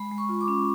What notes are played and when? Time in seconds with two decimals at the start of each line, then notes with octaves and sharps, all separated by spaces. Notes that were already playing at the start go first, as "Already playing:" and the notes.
Already playing: G#3 B5
0.11 G#3
0.18 C#6
0.29 F4
0.41 D6
0.48 C#4